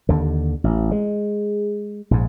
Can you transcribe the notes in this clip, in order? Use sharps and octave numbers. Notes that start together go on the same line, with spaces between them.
D#2 D3
A1
G#3
A#1 G#2